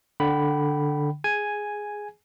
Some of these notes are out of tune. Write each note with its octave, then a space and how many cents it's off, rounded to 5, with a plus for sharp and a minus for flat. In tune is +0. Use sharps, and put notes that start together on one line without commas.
D3 +0 G5 -35 B5 +0
G#4 +0 G#5 +0